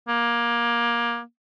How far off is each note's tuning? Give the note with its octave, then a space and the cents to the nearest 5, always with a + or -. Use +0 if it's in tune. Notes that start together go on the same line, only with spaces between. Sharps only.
A#3 +20